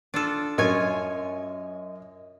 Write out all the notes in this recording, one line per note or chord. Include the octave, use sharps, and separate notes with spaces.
D4 F4 A4
F#2 F4 C#5 D#5 G#5